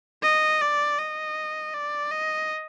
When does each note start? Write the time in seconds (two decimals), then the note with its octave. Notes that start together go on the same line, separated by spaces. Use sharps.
0.23 D#5
0.61 D5
0.98 D#5
1.74 D5
2.11 D#5